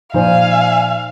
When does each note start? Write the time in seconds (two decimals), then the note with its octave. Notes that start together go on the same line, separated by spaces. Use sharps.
0.14 A#2 F3 D#4 C5 D5 F5 G#5